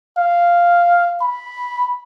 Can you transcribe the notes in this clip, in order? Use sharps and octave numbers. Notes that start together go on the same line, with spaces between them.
F5
B5